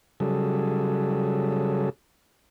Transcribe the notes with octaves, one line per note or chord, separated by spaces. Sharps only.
C#3 F#3 G3 G#4 A4